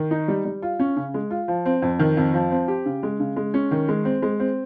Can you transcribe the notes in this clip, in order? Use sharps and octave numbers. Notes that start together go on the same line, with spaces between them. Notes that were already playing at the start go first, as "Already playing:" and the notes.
Already playing: D#3
D#4
G3
G3
F4
C#4
C#3
G#3
F4
F3
C4
F2
D#3
F2
F3
C4
G4
C#3
G#3
C#3
G#3
C#4
D#3
G#3
C4
G#3
C4